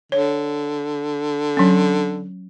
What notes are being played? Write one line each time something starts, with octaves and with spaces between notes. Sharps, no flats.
D3 C#5
F#3 C#4